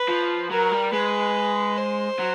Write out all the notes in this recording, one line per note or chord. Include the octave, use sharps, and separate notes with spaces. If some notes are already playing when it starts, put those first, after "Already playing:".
Already playing: B4
F3
F#3 A#4
G3
G#3 B4
C5
F#3